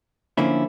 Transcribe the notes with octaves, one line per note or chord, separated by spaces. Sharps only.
D3 F3 A#3 C#4 E4